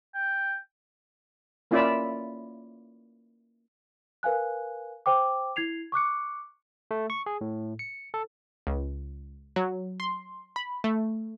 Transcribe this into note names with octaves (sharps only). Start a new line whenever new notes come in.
G5
A#3 C#4 E4 F4 D5 E5
A#4 B4 F5 G#5 F#6
C5 G5 D6
E4 G#6 C7 F7
C#6 D6 F#6 C#7
A3
C#6
G#4
A2
C#7
A4
C#2
F#3
C6
B5
A3